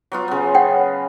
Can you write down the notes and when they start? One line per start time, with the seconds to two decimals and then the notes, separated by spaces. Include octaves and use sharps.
0.12 F#3 B3 F4
0.28 C#3 B3
0.55 C#5 F#5 G5